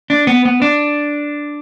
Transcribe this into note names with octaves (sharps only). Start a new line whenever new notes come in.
D4
B3
B3
D4